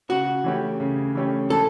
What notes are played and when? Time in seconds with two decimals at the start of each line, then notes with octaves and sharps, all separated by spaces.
0.09 C#3 F#4
0.44 E3 A3 C#4 G4
0.80 C#3
1.15 E3 A3 C#4 G4
1.50 E3 A4